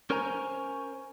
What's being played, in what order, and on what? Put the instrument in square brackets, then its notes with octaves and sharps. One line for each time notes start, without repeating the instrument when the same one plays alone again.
[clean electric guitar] C#4 A#4 C5 C#5 G#5 A#5